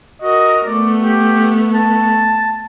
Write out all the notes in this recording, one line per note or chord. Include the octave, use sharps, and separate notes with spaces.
F#4 A#4 D#5
A3 B3 D5
G4
A5